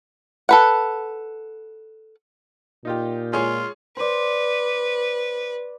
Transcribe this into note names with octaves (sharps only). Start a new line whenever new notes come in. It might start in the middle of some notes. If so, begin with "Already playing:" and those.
A4 B4 F#5
A#2 D#4 F4 G4
G#3 F4 G#4 C#5
B4 C5 D5